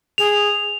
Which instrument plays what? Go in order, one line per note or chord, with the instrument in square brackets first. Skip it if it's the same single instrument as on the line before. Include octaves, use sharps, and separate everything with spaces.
[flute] G#4 [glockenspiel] F7